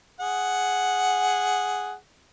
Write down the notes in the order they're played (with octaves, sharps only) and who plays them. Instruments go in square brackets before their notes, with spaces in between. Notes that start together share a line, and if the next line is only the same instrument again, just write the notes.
[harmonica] G#4 F#5